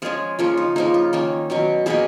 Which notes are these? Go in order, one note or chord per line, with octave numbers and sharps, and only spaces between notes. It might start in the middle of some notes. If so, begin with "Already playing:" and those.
F3 G#3 C#4 F4 G#4
C#3 F3 A#3 C#4 F4
D#4
C#3 F3 A#3 D#4
F4
D#3 A#3 C#4
B2 F#3 C#4
B2 A#3 C#4 G#4 B4